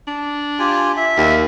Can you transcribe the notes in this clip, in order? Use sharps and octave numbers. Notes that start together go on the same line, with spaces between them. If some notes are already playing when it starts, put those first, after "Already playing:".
D4
F4 G4 G#5
E5
D#2